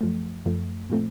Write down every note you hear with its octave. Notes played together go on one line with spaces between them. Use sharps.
F#2 F3 A3
F#2 F3 A3
A#2 F3 A3 C4